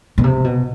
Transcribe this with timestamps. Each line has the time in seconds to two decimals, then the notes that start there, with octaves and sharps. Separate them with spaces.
0.18 B2
0.24 C3
0.44 B2